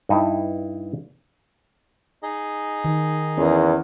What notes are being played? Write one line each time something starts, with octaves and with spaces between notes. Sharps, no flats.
G2 D#4 E4
D#4 G#4 D#5
D#3
E2 C#4 A#4